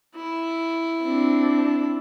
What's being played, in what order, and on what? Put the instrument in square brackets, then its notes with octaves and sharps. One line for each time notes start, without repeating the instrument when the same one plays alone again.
[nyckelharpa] E4
[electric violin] C4 D4